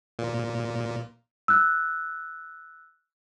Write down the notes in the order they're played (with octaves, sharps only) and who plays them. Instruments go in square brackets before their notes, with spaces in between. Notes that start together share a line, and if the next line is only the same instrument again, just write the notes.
[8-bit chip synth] A#2
[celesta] E6 F#6